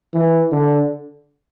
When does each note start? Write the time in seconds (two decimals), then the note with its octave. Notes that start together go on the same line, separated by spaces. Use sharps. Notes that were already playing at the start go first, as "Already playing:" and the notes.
0.14 E3
0.52 D3